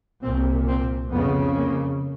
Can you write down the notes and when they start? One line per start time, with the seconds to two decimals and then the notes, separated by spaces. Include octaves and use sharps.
0.23 C2 A#2 C4
0.68 C4
1.13 F2 C#3 B3
1.58 A#3